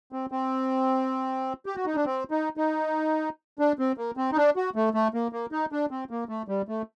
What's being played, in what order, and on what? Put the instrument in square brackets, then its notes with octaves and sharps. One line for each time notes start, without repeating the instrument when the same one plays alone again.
[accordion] C4
C4
G4
F#4
D#4
D4
C4
D#4
D#4
D4
C4
A#3
C4
D#4
D4
F#4
A3
A3
A#3
A#3
D#4
D4
C4
A#3
A3
G3
A3